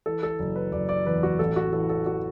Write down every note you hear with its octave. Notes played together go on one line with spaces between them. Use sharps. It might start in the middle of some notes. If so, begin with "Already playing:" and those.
E3 A4
A4
F#1
B4
F#1 D5
D5
E2 B4
F#4
A1 A4
F#4
E3 A4
A4
F#4